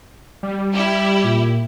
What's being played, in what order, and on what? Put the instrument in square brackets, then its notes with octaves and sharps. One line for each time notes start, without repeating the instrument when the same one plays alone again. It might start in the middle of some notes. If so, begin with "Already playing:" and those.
[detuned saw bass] G3
[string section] E4 G4
[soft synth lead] A#2